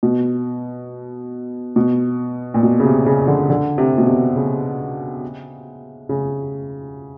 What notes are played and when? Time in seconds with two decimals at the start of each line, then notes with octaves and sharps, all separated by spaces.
0.03 B2
1.76 B2
2.54 A#2
2.63 B2
2.80 C#3
2.85 C3
3.06 C#3
3.28 D3
3.50 D3
3.78 C3
3.98 B2
4.07 C3
4.36 C#3
6.09 C#3